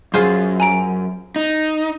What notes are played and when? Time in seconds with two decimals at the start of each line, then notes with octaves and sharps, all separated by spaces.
0.14 F#2 F4 G#4 C5
0.60 G#5 A#5 D7
1.36 D#4